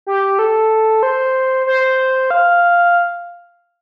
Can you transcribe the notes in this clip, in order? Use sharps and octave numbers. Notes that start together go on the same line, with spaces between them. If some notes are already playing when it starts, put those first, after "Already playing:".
G4
A4
C5
C5
F5